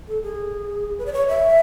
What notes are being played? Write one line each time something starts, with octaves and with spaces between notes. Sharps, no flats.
A4
G#4
B4
D5
C#5
E5